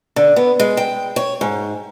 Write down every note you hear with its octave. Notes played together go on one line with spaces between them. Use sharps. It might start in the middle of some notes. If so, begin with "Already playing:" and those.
D3
B3
G#3
G5
C#5
G#2